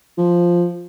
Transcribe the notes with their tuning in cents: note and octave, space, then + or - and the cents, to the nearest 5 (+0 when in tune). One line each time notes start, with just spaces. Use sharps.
F3 +0